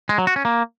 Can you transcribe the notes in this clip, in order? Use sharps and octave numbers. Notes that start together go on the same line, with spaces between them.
G#3
F#3
F#4
C#4
A#3